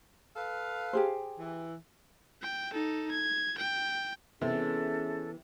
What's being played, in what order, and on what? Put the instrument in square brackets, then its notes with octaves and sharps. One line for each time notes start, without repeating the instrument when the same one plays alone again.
[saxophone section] A4 B4 F5
[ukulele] G4 G#4 C5
[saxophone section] E3
[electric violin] G5
D#4 A4
G#6
G5
[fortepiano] C3 [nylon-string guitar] E3 B3 [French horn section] C#4 G#4 [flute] A4